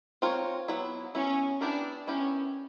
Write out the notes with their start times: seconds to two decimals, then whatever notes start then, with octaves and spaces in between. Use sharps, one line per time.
0.22 C4 F4 A#4 C#5
0.68 F#3 B3 E4
1.15 F#3 B3 C#4 E4
1.61 B3 D4 E4 G4 A#4
2.07 B3 C#4 E4 G4 A#4